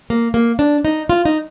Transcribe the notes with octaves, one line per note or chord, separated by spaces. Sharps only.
A#3
A#3
D4
D#4
F4
D#4